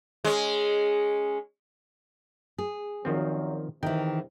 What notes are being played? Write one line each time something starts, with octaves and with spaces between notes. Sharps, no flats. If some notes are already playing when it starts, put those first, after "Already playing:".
G#3 C#4
G#4
F#2 A#2 D#3 F3 F#3 C4
E2 C3 D#3 E3 G5